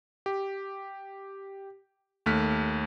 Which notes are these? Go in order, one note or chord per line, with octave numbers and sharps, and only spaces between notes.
G4
D#2 A3 F6 F#6 B6